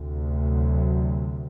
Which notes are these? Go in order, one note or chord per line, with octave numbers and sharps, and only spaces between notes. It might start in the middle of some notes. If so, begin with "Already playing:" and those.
Already playing: D2 C3
F#3